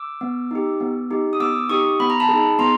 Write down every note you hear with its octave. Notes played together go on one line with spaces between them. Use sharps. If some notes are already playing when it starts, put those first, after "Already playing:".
Already playing: D6 E6
B3
D#4 G4
B3
D#4 G4
D#6
B3 D6 E6
D#4 G4 C#6 D#6
B3 B5
A#5
A5 B5
D#4 G#4
B3 A#5 C6